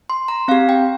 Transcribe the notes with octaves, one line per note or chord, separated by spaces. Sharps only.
C6
A#5
C4 G4 F5
G5